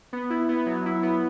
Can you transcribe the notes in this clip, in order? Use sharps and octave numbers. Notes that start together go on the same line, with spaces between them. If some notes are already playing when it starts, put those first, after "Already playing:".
B3
E4
B3
F#3
E4
B3